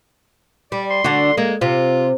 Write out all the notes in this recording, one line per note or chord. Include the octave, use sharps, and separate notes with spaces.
G3 D5
C6
D3 D4 F#4
G#3 A#3
C3 F4